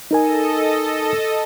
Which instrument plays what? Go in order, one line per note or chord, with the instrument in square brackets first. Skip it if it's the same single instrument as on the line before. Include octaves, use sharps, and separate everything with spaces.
[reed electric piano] D#4 A#4 G#5 [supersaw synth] A4 D#5